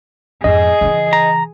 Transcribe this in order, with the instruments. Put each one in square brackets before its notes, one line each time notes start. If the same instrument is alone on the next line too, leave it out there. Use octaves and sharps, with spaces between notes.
[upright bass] F2 G#2 [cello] G#4 [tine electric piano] D#5
[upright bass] C#3 E3
[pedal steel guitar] A#5